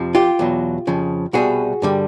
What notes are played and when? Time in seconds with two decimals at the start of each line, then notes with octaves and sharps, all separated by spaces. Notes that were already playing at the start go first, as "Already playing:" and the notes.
Already playing: F2 C3 F3
0.15 F4 G4
0.39 E2 B2 F#3
0.87 F2 C#3 F3
1.33 C2 B2 G3 F#4 G#4
1.82 G2 D3 G3